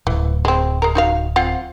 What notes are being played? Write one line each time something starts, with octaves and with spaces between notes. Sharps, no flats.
D1 E3
G#3 C4
G#3 A#4
D#4 F#4 F5
C4 F4 F#5